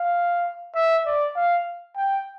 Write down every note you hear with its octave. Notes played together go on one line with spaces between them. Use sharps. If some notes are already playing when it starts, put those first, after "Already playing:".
Already playing: F5
E5
D5
F5
G5